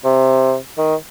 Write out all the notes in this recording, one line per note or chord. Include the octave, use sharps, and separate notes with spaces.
C3
D#3